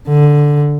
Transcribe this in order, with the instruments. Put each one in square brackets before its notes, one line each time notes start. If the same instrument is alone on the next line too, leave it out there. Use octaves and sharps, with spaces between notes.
[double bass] D3